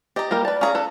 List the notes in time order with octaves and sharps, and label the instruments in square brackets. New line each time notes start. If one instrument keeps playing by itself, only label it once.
[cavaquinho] G4 A#5 [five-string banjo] D5 D#5
[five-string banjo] G3 A#3 A#4
[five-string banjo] B4 A5 [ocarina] D5
[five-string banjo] C#4 G#4 [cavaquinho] F5 A#5
[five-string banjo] A4 B4